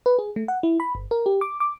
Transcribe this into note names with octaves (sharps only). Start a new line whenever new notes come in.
B4
G#4
A3
F#5
E4
B5
G1
A#4
G4
D6
D6